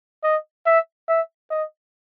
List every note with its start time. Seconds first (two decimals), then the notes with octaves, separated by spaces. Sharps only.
0.24 D#5
0.66 E5
1.08 E5
1.50 D#5